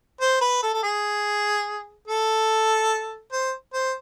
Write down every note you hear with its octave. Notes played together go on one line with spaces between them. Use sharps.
C5
B4
A4
A4
G#4
A4
C5
C5